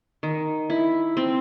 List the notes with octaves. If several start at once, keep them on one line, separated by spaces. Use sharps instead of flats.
D#3
E4
C4